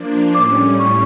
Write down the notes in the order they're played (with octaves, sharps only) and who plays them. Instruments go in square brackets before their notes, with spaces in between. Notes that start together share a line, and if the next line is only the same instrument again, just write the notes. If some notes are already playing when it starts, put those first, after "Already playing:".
Already playing: [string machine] F3 A#3 D4
[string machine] A2 G3 C#4 [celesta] D6
[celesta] C#6